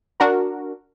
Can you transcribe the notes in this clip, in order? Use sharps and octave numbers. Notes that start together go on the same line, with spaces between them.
D4 F#4 A#4